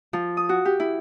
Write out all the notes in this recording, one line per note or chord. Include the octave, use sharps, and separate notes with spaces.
F3
D#6
F#4
G4
E4